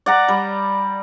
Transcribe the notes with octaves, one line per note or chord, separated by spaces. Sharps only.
D5 F#5 A#5
G3